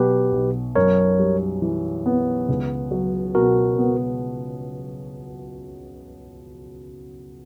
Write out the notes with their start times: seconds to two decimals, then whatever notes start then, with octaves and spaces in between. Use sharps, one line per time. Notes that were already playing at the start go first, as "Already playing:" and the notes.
Already playing: B2 F#3 G4 B4
0.32 B1
0.75 F#2 A#4 C#5
1.19 G3
1.62 E3
2.06 B3
2.49 C#2
2.91 F#3
3.35 B2 F#4 A#4
3.78 B3